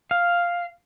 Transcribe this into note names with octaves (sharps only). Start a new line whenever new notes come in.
F5